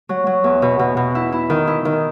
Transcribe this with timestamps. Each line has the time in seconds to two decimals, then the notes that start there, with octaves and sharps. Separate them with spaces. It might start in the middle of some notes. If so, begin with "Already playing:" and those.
0.09 F#3
0.27 F#3
0.44 E2
0.62 B2
0.79 B2
0.97 B2
1.15 E4
1.32 E4
1.50 D#3
1.67 E4
1.85 D#3